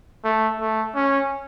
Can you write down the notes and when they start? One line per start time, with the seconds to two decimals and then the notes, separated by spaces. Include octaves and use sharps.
0.24 A3
0.60 A3
0.95 C#4